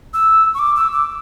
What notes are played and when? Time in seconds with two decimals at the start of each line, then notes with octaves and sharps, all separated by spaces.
0.14 E6
0.54 C#6
0.59 D6
0.76 E6
0.93 D6